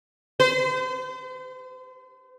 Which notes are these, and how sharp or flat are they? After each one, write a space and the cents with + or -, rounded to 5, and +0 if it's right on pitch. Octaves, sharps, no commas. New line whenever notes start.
C5 -40